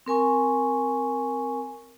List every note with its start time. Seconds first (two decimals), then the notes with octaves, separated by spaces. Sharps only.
0.06 C4 A#4 G#5 C#6